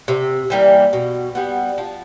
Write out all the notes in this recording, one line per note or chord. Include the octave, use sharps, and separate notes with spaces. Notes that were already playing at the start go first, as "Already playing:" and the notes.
C3
E3 G3 A#3
B2
G3 B3
F3